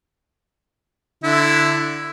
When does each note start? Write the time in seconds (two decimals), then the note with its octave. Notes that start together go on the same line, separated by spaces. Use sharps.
1.23 D3 E4